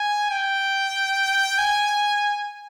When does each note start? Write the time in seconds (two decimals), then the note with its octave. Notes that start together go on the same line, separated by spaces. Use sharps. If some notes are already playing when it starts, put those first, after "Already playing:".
Already playing: G#5
0.31 G5
1.58 G#5